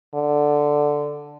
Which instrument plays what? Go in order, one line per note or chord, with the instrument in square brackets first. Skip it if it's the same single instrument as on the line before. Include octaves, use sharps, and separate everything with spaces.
[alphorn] D3